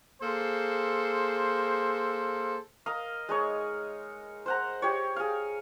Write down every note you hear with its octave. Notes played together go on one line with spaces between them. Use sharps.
A#3 G#4 A4 C5
A#4 D#5 F5
G#3 D#4 C#5
C5 F#5 A#5
G4 C#5
G#4 F5